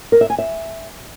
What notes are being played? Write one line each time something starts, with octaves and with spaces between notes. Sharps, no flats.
A#4
E5
G#5
E5